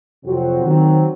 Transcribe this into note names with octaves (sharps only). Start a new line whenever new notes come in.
F2 C3 F#3 C4 F#4
D#3 F#3 C4